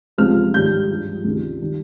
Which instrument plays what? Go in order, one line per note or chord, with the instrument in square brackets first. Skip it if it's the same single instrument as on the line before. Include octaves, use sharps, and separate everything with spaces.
[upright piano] C#2 C3 F3 G#3 C4 F6
G#2 D#3 G3 G6
G2 F3 G#3
C#2 C3 D#3 G#3
D#3 G3